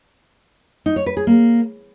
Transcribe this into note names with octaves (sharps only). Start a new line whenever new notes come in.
D#4
C#5
B4
G#4
A#3